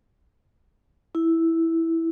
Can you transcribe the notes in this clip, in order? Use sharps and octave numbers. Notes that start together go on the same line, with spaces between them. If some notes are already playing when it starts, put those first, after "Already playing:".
E4